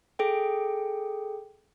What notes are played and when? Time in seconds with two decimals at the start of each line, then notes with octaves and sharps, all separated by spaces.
0.19 G#4 A4 G5